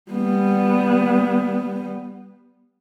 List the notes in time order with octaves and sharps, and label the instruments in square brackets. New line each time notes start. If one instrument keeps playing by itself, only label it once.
[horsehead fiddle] G3 B3